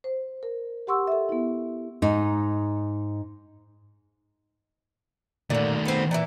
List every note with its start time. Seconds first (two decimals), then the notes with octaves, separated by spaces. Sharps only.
0.04 C5
0.43 A#4
0.87 G4 F#5 C6 C#6 E6
1.07 A4 E5
1.29 B3 E4
2.02 G#2 D#4
5.50 A#2 D3 D#3 A3
5.85 B3 C4
6.11 A#2 D#3 E3